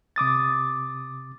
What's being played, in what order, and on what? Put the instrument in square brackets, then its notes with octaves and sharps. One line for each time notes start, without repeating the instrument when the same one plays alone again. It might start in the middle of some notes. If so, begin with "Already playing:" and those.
[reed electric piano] C3 D6 D#6 A6